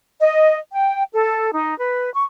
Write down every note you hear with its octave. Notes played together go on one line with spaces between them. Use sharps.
D#5
G5
A4
D#4
B4
C#6